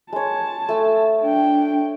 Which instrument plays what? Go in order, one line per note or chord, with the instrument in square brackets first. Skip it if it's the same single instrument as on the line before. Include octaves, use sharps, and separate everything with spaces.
[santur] G#3 C#5 [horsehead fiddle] A5
[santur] A3 E6
[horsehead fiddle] D4 G5